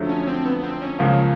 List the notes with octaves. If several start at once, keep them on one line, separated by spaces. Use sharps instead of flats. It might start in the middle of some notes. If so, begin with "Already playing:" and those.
Already playing: F2 D3 F#3 A3
C#4
C4
B3
B3
C4
C#4
C#2 C#3 F3 A#3